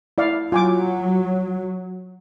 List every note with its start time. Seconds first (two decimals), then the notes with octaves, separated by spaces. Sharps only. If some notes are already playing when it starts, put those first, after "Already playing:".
0.18 E4 D5 F5
0.52 F#3 F4 G#5 D6